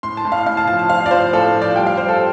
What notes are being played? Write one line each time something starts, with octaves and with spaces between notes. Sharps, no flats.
A2 C6
A5
A2
F5
A2 F5
A5
F3 A5
A5
F3 F5
D5
F3 C5
A2 A4
F3
D5
G3 G5
F5
G3 C5
A4